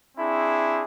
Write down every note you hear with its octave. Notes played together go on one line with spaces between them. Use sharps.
C4 D4 E4 G#4